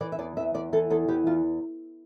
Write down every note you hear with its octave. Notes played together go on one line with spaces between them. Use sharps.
E3 D5
E5
E2 D5
E3 E5
E2 D5
E3 A4
E2 A4
E3 G4
E2 F4